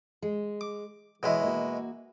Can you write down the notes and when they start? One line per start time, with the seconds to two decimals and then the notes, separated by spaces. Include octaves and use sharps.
0.22 G#3
0.61 D6
1.23 B2 E3 G#3 E4 B4 C#5
1.43 A#3 F#4